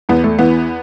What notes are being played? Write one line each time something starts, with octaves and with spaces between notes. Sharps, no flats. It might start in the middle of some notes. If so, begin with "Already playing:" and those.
E2 B3
A3
E3 B3